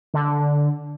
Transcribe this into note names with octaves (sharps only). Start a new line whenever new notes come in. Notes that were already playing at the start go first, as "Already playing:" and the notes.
D3